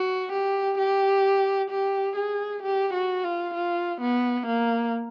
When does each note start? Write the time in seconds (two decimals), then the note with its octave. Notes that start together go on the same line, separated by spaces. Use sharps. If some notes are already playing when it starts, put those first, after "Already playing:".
Already playing: F#4
0.32 G4
0.78 G4
1.70 G4
2.16 G#4
2.62 G4
2.93 F#4
3.24 F4
3.54 F4
4.01 B3
4.47 A#3